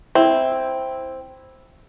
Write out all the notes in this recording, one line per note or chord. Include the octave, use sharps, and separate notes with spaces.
C4 E4